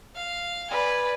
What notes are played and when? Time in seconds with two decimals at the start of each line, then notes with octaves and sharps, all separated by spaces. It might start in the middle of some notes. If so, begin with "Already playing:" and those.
0.15 F5
0.71 B4 D5 G#5